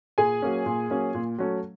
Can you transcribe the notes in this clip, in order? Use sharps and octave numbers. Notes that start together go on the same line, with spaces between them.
A#2 G#4 G#5
F#3 A#3 C#4
A#2
F#3 A#3 C#4
A#2
F#3 A3 C#4